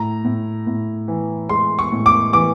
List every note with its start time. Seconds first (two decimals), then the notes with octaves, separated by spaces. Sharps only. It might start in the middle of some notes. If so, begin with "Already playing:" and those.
Already playing: A2 A#5
0.25 A2
0.67 A2
1.08 E3
1.49 G#3 C6
1.79 C#6
1.92 A2
2.06 D6
2.33 E3 D6